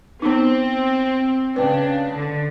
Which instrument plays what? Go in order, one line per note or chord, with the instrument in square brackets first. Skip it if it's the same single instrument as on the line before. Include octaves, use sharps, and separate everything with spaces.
[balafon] B3 D#4 [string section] C4
[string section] C#3 D4 [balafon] B4 G5
[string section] D3